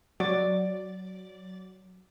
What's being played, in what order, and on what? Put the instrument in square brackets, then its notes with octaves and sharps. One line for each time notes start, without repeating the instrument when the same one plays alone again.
[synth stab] F#3 [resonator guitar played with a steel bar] D5